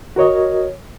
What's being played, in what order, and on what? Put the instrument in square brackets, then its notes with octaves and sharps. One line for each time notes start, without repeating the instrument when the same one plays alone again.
[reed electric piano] F#4 A#4 C#5 D#5